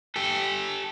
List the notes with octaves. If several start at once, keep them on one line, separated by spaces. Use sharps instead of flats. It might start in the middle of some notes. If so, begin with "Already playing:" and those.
G4 A4